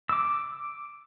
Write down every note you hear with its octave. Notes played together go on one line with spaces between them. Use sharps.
D6 E6